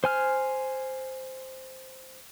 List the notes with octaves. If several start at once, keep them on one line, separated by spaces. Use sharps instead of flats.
C5 G#5 F6